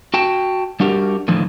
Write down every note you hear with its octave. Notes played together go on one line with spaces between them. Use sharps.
F#4 G5 A5
G3 D4 F#4 G4 A#4
A2 D3 D#3 F3